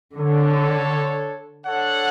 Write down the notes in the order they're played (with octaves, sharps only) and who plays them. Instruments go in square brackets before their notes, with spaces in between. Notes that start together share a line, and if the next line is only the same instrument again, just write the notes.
[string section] D3 [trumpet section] D4 A4 C#5
[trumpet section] D4 A4 C#5 F#5